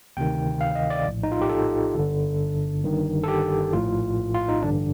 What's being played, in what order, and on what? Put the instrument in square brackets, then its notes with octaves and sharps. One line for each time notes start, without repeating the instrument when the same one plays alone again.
[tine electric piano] D2 C3 D#3 G5
F5
D#5
D5
A#1 A2
D#4
F4
G4
A4
G1 G2 D3
G1 G2 D#3
A4
G4
A#1 A2 F4
F4
D#4
A1 G2 D3 D4